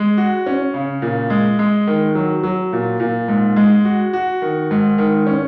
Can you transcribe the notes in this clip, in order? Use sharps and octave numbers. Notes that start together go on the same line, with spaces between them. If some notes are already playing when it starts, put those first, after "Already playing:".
Already playing: G#3
F#4
C#4
C#3
A#2
G#3
G#3
D#3
F#3
F#3
A#2
A#2
G#2
G#3
F#4
F#4
D#3
G#2
D#3
C#4